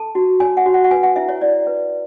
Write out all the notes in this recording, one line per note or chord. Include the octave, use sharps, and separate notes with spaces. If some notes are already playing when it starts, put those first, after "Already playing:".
Already playing: A4 A5
F#4
C#5 G#5
F#5
F#4
F#5
F#5
B4 G#5
F#5
E4 E5
C#5
E4 D5
B4